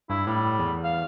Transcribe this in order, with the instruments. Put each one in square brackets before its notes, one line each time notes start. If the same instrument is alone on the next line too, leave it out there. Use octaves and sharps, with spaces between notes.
[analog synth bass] G2 [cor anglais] E4
[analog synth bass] A2 [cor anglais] G3
[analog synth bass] E2
[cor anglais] F5